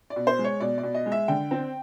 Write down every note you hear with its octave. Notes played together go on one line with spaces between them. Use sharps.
D5
B2
C5
G#3
C#5
B2 D5
D5
B2
D#5
G#3
E5
D3 G5
C4